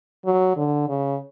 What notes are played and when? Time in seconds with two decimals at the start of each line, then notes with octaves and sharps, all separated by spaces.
0.25 F#3
0.57 D3
0.88 C#3